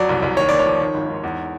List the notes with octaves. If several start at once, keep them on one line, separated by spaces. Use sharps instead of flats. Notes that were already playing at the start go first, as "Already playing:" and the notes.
Already playing: F2 F#3 D5
C2
C2
D#2 C#5
D#2 D5
C#5
F3
D#3
G#1
G#2
E2